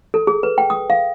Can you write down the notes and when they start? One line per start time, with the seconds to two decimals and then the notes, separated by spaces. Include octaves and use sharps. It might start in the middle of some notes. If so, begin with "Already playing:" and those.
0.14 A4
0.27 G#4
0.43 B4
0.58 G5
0.70 D#6
0.90 F5